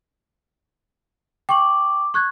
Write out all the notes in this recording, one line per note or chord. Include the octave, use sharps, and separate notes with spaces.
G5 C#6 D6 F#7
C#6 F#6 G#6